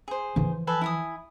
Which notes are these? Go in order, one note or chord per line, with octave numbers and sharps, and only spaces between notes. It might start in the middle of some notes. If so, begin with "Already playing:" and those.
G#4 C5
E3 F3
A4 B4 G#5
E4 G#5 D#6